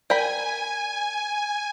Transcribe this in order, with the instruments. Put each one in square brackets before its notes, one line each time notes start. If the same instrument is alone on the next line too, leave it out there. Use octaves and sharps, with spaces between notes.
[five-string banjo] A#4 G5 B5 [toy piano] D5 [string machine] G#5